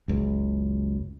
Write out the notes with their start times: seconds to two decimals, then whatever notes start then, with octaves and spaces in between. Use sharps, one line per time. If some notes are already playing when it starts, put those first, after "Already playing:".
0.08 F#1 C#2